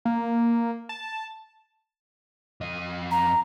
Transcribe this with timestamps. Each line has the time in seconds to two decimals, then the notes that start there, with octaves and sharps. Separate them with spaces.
0.05 A#3
0.89 A5
2.61 F2 D#5
3.11 A#5